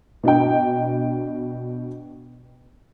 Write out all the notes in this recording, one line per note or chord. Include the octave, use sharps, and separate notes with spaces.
B2 D4 D#5 G5